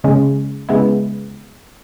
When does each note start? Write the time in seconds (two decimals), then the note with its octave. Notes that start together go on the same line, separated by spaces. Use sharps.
0.04 C#3 G#3 C#4
0.69 C#3 G#3 B3 E4